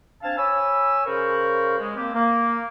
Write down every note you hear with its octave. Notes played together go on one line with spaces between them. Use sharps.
C4 D4 F5 G#5 A5
C#5 G#5 B5 E6
C#3 A#4 C5 F5 B5 C#6
G#3
A#3 C4 G4
A#3